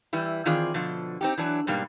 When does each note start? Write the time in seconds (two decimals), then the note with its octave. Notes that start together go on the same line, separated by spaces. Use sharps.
0.13 E3 G3 E4
0.45 D#3 E3 C4 F4 G#4 D5
0.74 B2 D3 F3
1.21 C4 D#4 G4
1.38 E3 F#3 D4
1.67 G#2 B2 G3 A#3 D4